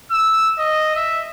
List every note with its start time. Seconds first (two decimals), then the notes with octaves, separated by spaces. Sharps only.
0.11 E6
0.59 D#5
0.96 E5